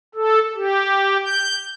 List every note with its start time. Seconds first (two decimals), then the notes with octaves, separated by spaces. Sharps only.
0.15 A4
0.55 G4
1.25 G6